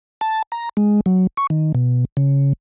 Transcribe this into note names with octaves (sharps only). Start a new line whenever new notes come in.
A5
A#5
G#3
F#3
C#6
D#3
B2
C#3